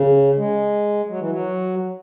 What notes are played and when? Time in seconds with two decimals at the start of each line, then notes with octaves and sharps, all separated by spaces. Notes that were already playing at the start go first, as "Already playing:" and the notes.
Already playing: C#3
0.37 G#3
1.09 F#3
1.20 E3
1.30 F#3